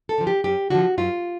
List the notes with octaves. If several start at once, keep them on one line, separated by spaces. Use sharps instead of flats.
A4
D3 F3
G4
F#2 G4
D3 F3 F#4
F#2 F4